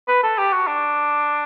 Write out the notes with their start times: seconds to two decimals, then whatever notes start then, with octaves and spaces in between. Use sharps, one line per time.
0.08 B4
0.23 A4
0.38 G4
0.52 F#4
0.68 D4